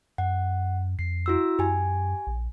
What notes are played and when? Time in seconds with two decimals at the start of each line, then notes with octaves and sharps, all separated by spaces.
0.18 F#2 F#5
0.99 F2 C7
1.26 E4 F#4 E6
1.59 F#2 G4 G#5
2.27 A#1